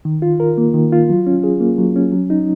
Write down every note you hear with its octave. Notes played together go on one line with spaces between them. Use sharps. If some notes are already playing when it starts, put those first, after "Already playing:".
D#3
F4
A#4
A#3
D#3
F4
F#3
C#4
G#4
A#3
F#3
C#4
F#3
D#4